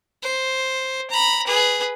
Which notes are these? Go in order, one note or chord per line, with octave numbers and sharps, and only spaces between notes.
C5
A#5 B5
G#4 B4